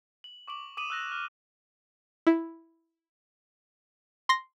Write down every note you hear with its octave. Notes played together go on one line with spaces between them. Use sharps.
F#7
C#6 D6 D7 F#7
D6 D#6 D#7 E7 F#7
E6 F#6 A#6 F7
F6
E4
C6 A#6